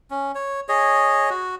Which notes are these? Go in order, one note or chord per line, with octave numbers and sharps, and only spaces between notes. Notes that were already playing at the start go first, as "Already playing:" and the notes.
C#4
C#5
G#4 C#5 D#5
F#4